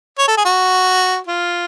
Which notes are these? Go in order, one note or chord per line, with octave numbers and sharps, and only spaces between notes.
C#5
A4
G#4
F#4
F4